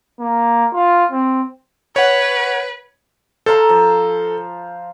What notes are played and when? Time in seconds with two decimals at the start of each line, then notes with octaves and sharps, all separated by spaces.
0.20 A#3
0.73 F4
1.12 C4
1.96 B4 C#5 F#5
3.46 A4 C5 F5 A#5
3.69 F3